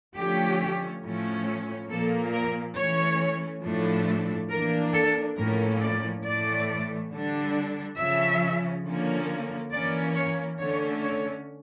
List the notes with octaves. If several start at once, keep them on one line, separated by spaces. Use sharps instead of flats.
D3 F3 A3 C#4 G4
A2 F3 A3 C#4
A#2 F3 A#3 A4
A#4
E3 A3 C#4 C#5
A2 F3 A3 D4
E3 A#3 D4 A#4
A4
A2 F3 A#3 C#4 A#4
D5
A2 E3 A3 D5
D3 G3 D4
C#3 F3 C#4 E5
D3 F3 A#3 C#4
E3 A#3 C#4 D5
C#5
D3 A3 C#4 C#5
C#5